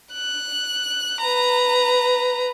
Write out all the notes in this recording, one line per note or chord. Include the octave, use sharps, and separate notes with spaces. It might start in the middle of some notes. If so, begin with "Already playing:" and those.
F#6
B4 A#5